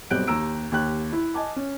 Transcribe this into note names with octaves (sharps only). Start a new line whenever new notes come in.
B1 G3 C4 F#6 G6 D7
D#2 G4 A#5 E6 D7
D#2 G4 F#6
E4
D#5 G#5 A5 D6
C#4